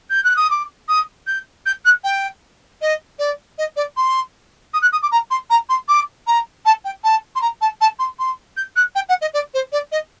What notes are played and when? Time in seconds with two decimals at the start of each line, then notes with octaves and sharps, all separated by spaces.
0.10 G6
0.24 F#6
0.36 D#6
0.50 D6
0.88 D#6
1.27 G6
1.66 G6
1.85 F#6
2.04 G5
2.81 D#5
3.18 D5
3.58 D#5
3.76 D5
3.96 C6
4.73 D#6
4.82 F#6
4.92 D#6
5.02 D6
5.11 A#5
5.30 C6
5.50 A#5
5.69 C6
5.88 D6
6.27 A#5
6.65 A5
6.84 G5
7.03 A5
7.35 C6
7.41 A#5
7.61 A5
7.80 A5
7.99 C6
8.19 C6
8.57 G6
8.76 F#6
8.95 G5
9.09 F#5
9.21 D#5
9.33 D5
9.54 C5
9.72 D5
9.91 D#5